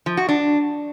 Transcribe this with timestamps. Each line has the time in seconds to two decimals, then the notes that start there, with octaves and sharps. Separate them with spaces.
0.06 F3
0.17 F#4
0.29 D4